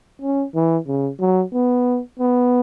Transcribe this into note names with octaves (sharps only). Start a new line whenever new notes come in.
C#4
E3
C#3
F#3
B3
B3